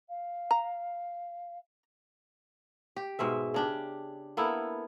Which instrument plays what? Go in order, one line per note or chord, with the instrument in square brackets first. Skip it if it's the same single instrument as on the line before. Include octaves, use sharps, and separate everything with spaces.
[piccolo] F5
[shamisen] A#5
[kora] G4
G#2 B2 G#3 E5
C#3 D4 G4
A#3 B3 E4 A4